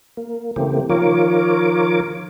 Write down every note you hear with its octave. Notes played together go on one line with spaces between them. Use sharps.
A#3
C#3 E3 A3 A#3 C4 G4
D#3 F3 F4 A#4 C#5 D6